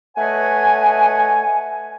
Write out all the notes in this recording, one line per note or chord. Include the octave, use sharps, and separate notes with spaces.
A3 B4 C#5 D#5 F#5 G#5